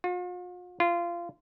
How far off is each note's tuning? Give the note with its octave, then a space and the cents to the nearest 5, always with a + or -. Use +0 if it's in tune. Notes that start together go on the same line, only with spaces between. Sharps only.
F4 +45
F4 -20